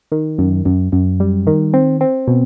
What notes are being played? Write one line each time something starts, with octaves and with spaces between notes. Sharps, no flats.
D#3
F#2
F#2
F#2
G3
D#3
C4
C4
B2